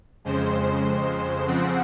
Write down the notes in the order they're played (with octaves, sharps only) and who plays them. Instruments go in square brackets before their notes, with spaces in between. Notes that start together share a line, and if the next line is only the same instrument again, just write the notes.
[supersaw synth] F2 C#3 G#3 C5
C#3 F3 C4 F#5